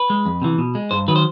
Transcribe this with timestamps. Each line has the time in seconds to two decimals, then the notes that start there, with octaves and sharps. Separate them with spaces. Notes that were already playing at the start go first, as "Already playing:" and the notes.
Already playing: B4
0.10 G#3
0.26 F2
0.42 C3 E3
0.58 B2
0.75 G#3
0.91 G2 C5
1.08 D#3 F#3 B4
1.16 C5